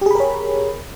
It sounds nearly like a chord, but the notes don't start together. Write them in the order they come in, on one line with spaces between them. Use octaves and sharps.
G4 G#4 B5 A#4 C#5